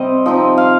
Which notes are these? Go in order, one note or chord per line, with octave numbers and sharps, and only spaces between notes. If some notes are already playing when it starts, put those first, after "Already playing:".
Already playing: C3 G3 C4 D#5
F3 C4 D#4 D#5
F5